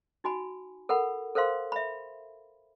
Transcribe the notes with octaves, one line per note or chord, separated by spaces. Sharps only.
D#4 F#4 G#5 B5
A4 A#4 F#5 B5
A4 A#4 C5 F5 C6
E5 B5